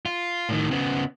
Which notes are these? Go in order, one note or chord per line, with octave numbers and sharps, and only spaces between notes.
F4
A2 D#3
C#3 B3